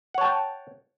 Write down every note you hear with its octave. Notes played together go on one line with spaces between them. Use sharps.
C#5 F#5 G5 A5